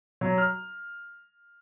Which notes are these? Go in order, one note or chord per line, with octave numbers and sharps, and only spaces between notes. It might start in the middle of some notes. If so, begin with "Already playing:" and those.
F#3
F6